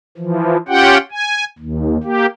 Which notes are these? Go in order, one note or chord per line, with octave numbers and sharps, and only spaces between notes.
E3 F3
C#4 F4 G4 F#5 G5
G#5
D#2
A#3 G4